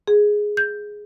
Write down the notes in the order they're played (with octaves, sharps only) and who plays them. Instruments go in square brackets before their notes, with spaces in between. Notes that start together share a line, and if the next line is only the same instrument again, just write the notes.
[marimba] G#4
G6